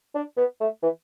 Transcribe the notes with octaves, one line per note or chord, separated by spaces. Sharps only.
D4
B3
A3
E3